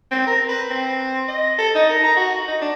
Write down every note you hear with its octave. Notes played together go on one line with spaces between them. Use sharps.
C4
A#4
B4
C4
D#5
A4
D#4
A#4
A#5
F#4
D#4
D4